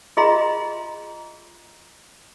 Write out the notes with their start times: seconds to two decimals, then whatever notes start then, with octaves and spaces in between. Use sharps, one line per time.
0.17 F4 G#4 D#5 E5 A#5 C6